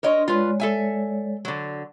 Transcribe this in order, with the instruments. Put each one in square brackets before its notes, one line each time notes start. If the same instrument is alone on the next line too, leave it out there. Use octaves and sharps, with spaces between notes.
[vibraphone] D4 C6 [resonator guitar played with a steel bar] A#4 C#5 D#5
[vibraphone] G#3 C#5 D5 [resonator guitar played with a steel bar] F4 B4
[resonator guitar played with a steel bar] A4 E5 G#5
D3 F#3